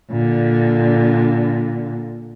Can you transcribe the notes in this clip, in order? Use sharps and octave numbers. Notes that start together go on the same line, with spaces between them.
A#2 D3